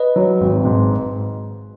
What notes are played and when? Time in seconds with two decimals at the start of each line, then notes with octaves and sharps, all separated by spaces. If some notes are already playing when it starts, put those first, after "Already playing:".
Already playing: B4 D#5
0.16 F#3
0.41 G#1
0.65 G#2